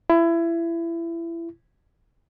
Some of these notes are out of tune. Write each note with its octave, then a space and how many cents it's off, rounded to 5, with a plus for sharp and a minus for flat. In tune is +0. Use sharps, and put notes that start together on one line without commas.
E4 +25